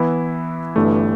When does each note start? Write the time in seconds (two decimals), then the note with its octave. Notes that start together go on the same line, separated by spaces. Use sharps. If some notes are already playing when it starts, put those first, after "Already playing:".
Already playing: E3 B3 E4
0.76 G1 G2 E3 A3